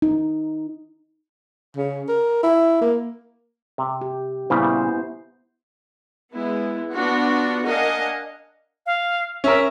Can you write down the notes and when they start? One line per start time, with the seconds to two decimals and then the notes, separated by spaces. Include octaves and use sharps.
0.02 D#4
1.77 C#3
2.09 A#4
2.43 E4
2.81 A#3
3.78 C3
4.01 G4
4.50 A#2 C#3 G3 B3 E4 C5
6.33 G#3 B3 E4
6.93 B3 D4 F4 F#4 F#5
7.64 D4 A#4 D#5 F5 F#5 G#5
8.86 F5
9.44 C#4 A#4 E5